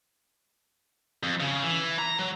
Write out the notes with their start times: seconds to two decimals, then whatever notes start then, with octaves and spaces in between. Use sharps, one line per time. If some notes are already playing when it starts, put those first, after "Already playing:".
1.23 F2
1.40 C#3
1.63 E3
1.98 A#5
2.19 F#3